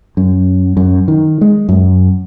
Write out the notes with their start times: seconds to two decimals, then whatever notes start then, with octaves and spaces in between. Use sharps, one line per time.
0.17 F#2
0.77 F#2
1.08 D#3
1.41 G#3
1.69 F#2